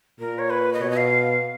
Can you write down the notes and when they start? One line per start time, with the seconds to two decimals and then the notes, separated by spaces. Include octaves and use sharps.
0.19 A#2 A#4
0.39 C#5
0.50 B4
0.73 D#5
0.81 B2 C#5
0.90 D#5
0.97 F5